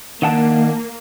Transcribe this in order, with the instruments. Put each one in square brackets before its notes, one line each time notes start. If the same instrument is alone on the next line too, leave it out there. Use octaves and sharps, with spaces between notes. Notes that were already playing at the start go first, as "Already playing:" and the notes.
[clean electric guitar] D#3 F#5 A5 [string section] A#3